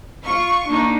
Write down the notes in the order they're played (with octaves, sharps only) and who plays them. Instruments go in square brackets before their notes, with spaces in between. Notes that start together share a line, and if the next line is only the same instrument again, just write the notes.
[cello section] F4 [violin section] C#6
[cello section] A#3 D4 D#4